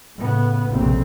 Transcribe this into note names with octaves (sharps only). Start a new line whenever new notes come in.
A2 C#3 B3
F1 A#1 F2 C#3 A#3 C4